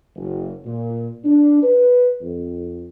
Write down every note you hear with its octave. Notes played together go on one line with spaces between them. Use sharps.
F#1
A#2
D4
B4
F2